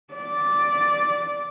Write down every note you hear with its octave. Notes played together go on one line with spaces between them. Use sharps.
D5